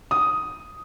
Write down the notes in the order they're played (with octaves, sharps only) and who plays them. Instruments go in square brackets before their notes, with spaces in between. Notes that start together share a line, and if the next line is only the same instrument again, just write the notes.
[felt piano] D#6